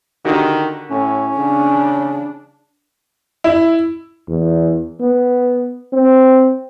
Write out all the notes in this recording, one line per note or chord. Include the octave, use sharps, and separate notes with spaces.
D3 D#3 F#4 G4
A2 C#4
C#3 D4
E4
E2
B3
C4